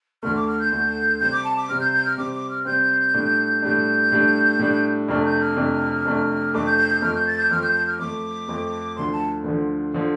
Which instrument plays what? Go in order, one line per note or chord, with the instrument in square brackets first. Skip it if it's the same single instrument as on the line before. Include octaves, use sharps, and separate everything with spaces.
[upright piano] D2 D3 A3 [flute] F6
[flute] D6
F6
G6
[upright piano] D2 D3 A3
[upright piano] C3 G3 C4 [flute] G6
[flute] D6
A5
D6
[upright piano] C3 G3 C4 [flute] F6
[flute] G6
G6
F6
[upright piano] C3 G3 C4 [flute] D6
[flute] D6
F6
[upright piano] C3 G3 C4 [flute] G6
[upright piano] A2 G3 D4
[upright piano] A2 G3 D4 [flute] G6
[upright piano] A2 G3 D4
A2 G3 D4
[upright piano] F2 C3 A3 D4 [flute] F6
[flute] G6
F6
[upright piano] F2 C3 A3 D4
F2 C3 A3 D4
[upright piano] F2 C3 A3 D4 [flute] D6
[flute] G6
G6
G6
[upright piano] F2 F3 A3 [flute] F6
[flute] G6
A6
G6
[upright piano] F2 F3 A3 [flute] F6
[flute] G6
G6
F6
[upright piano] F2 F3 A3 [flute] D6
[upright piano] F2 F3 A3
[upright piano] D2 D3 F3 [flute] C6
[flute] A5
[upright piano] D2 D3 F3
D3 F3